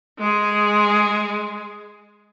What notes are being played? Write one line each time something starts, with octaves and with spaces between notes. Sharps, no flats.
G#3 G#4